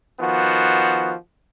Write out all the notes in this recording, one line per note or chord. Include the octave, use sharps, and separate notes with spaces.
D#3 F3 B3 F#4